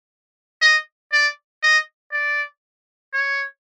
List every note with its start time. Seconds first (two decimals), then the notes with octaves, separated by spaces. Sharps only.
0.62 D#5
1.13 D5
1.63 D#5
2.12 D5
3.13 C#5